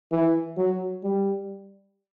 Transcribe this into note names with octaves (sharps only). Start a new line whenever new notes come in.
E3
F#3
G3